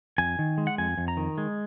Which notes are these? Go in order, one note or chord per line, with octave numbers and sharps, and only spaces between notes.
F2 G#5
D#3
G#3
F#5
F2 G#5
F2
A#5
D#3
G#3